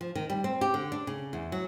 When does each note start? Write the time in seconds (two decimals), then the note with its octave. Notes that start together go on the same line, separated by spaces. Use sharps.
0.01 F3
0.15 D#3
0.30 G3
0.44 C4
0.61 G4
0.74 D3
0.92 D4
1.07 C#3
1.33 E2
1.52 F#3